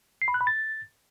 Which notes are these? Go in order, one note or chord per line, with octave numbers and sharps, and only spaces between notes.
C7
B5
F#6
B5
A6